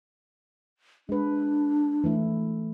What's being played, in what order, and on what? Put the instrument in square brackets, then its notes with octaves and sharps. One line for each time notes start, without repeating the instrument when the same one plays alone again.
[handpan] G#3 B4 [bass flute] D4
[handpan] E3 A3 E4